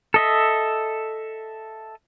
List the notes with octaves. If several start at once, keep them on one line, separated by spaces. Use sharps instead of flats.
A4 D#5 E5